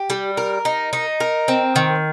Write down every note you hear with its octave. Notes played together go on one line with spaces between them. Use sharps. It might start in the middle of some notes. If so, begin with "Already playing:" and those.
Already playing: G4
G3
A#4
D#4
D#4
A#4
C4
D#3